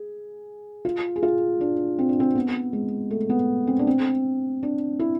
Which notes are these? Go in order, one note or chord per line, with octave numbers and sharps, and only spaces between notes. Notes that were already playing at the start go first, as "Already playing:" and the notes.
Already playing: G#4
F4
G#4
F4
D4
C4
D4
C4
B3
G#3
A3
B3
C4
D4
C4
D4
E4